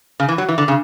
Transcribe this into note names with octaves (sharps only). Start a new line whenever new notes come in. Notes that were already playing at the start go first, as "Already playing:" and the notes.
C#3
E3
F#3
E3
D3
C#3